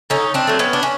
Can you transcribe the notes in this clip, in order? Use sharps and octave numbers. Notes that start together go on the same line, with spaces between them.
D3 C#4 D#4
C4 D4
F#3 A3
B3 C#4
D4
C#4